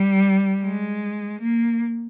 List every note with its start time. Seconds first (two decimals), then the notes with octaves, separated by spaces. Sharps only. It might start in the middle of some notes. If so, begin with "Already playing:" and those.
Already playing: G3
0.64 G#3
1.41 A#3